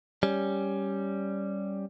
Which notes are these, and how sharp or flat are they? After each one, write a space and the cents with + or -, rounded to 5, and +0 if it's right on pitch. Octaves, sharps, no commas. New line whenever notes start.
G3 +0 C#4 +0